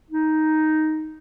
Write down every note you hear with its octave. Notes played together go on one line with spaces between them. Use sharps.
D#4